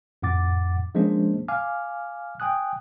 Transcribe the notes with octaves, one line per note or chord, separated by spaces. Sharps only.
F2 A2 F#5 D6 A6
F3 G#3 A#3 C#4 D4 C5
F5 G#5 D6 F6
G5 G#5 D#6 F#6